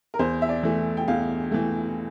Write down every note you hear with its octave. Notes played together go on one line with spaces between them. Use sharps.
A#4
E2 C5
E5
D5
E3 A3
G5
E2 F5
E3 A3